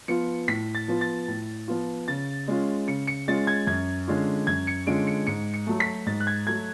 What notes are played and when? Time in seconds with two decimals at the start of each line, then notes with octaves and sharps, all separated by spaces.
0.08 F3 B3 F4 C#7
0.48 A2 B6
0.75 A6
0.88 F3 B3 F4
1.01 A6
1.28 A2
1.68 F3 B3 F4
2.08 C#3 A6
2.48 G#3 C#4 F4
2.87 C#3 C#7
3.07 C#7
3.28 G#3 C#4 F4 A6
3.47 G#6
3.67 F#2 G#6
4.08 D3 G#3 C#4 F4
4.47 F#2 G#6
4.67 C#7
4.87 D3 G#3 C#4 F4 D7
5.07 C#7
5.27 G#2 C#7
5.54 C#7
5.67 F#3 A3
5.80 B6
6.06 G#2 A6
6.20 F#6
6.27 G#6
6.47 F#3 A3 G#6